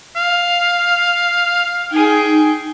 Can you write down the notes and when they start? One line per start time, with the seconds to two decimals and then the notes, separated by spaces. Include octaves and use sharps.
0.16 F5
1.92 D#4 G#4 G5